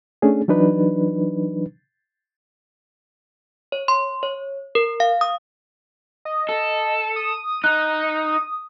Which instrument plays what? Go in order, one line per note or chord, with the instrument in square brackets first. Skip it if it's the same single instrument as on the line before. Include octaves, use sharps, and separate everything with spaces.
[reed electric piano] A3 C#4 D4 G#4
E3 F#3 D4 D#4 B4
[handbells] C#5
C6
C#5
A#4
F5
D#6
[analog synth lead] D#5
[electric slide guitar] A4
[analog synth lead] D#6
[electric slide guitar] D#4 [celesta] F#6